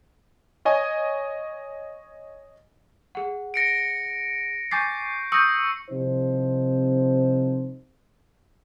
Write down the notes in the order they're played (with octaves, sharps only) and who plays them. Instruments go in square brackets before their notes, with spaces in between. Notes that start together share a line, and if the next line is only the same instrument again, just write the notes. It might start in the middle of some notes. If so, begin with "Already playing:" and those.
[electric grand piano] C#5 D#5 G#5 C#6
[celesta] G#4 F#5
[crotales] A#6 C#7 D7
[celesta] G#5 D6 A6 [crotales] C#6 G6 C7
[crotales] C#6 E6 C#7 [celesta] D#6 G6 A#6
[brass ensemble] C2 C3 F3 C4 D#4 C5